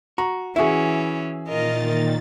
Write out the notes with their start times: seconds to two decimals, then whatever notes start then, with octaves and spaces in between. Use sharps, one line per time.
0.18 F#4 A#5
0.56 E3 C#4 E4 F#4 G#4 E5
1.48 A#2 D#3 F4 A#4 D#5 A6